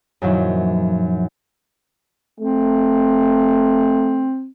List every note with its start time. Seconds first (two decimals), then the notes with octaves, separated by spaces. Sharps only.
0.22 F#2 A#2 D#3 F3 F#3 E4
2.40 A3 C4